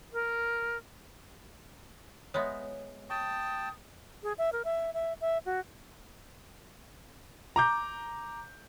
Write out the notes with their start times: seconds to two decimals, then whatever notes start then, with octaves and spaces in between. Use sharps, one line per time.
0.13 A#4
2.34 G#3 B3 C#5 E5
3.10 G5 A5 C#6 D#6
4.23 G#4
4.38 E5
4.53 A#4
4.65 E5
4.94 E5
5.21 E5
5.46 F#4
7.56 A#5 D6 G6